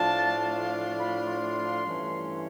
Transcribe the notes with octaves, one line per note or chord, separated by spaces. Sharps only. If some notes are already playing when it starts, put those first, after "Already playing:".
Already playing: A2 F3 A3 D4 F4 A5
B5
C6
G2 E3 A3 C#4